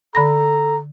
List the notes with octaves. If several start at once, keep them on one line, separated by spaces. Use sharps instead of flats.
D3 A4 A#5 B5 A#6